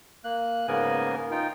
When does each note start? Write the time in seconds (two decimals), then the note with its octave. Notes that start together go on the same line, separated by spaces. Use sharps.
0.24 A#3 F#6
0.68 G#2 C#3 A#3 B3 A#4 G#5
1.31 D#4 F4 G5